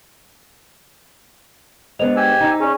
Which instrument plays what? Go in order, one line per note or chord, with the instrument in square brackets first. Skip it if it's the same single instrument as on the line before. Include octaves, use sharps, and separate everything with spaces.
[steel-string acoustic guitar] G#3 B3 D4 [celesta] C5 D#5 F7
[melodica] G4 G#5 E6
[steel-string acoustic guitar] D#4
[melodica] C#4 [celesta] G#4 D5